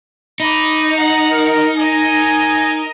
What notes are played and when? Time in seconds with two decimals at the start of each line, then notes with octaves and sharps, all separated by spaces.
0.40 D#4 B5 D6
0.92 F#5 A#5
1.32 A#4
1.77 A#4 D#5 G#5